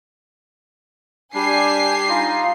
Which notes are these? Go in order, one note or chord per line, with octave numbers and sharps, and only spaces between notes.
G3 D4 G4 G#5 C7
D#4 F4 D#5